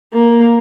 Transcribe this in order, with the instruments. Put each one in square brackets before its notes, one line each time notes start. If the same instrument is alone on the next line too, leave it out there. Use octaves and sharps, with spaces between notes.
[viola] A#3